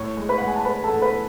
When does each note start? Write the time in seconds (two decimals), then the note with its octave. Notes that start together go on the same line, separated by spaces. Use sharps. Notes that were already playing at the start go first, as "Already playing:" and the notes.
Already playing: A2 C#5 C#6
0.17 G#3
0.29 B4 B5
0.38 G#3 F#5
0.48 G#5
0.56 A5
0.65 G#3 B4 B5
0.84 A4 A5
0.90 A2
1.02 B4 B5